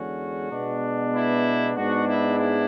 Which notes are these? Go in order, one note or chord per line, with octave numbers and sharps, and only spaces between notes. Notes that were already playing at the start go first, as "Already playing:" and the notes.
Already playing: E2 D3 G#3 C#4 F#4
B2 G#3 B3 D4
E4
G#2 G#3 B3 D4 F#4
E4
E4